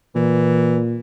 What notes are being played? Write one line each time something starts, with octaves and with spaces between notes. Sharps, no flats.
A#2 E3